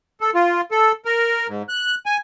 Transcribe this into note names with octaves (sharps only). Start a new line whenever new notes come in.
A4
F4
A4
A#4
G#2
F#6
G#5